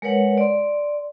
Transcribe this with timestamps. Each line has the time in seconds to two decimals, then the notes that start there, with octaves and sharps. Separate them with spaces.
0.02 G#3 A#4 B4 C#5 F#5
0.38 D5 C6